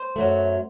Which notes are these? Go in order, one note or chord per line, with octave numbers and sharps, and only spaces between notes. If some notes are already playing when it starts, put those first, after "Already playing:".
Already playing: C5
F#2 F#3 A3